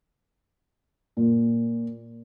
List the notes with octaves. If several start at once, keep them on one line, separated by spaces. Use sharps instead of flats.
A#2